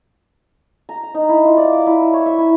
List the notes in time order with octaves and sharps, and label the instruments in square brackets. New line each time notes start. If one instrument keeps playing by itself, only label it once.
[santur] A#5
A#5
D#4
E4
F4
D5
D6
E4
E6
C#5
E5
E4